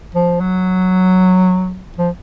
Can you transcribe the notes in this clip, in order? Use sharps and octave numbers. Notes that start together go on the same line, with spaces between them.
F3
F#3
F3